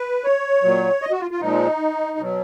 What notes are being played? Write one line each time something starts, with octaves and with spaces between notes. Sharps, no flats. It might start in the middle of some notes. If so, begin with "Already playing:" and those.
Already playing: B4
C#5
A#2 F#3
D#5
F#4
F4
F4
A#2 F3 G#3 D#4
B2 F#3